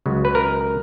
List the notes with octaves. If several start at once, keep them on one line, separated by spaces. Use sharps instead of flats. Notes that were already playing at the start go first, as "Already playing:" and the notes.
C#2 C#3 F#3
B4
A#4